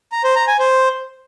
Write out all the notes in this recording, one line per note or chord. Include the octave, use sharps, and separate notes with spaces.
A#5
C5
A#5
G#5
C5